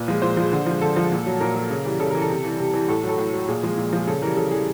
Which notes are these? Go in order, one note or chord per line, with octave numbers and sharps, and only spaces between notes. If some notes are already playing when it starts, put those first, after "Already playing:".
Already playing: A#2 B4
F3 G#3
A#2 C5
F3 G#3
D3
F3 G#3
D3 A4
F3 G#3
A#2
F#3
A#2 A#4
F#3
C#3
E3 G3
C#3 A4
E3 G3 A#4
A4
C3
E3 G3
C3
E3 G3
A2 A4
F#3 A4
A2
F#3
A#2 G#4
F3 G#3
A#2
F3 G#3
C#3 A4
E3 G3 A#4
C#3 A4
E3 G3 G#4